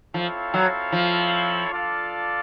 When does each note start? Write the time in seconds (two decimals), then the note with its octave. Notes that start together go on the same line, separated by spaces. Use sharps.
0.14 F3 C4 E4 A4 C#5 F5
0.54 F#3
0.92 F3
1.71 D4 F4 A4 D5 F5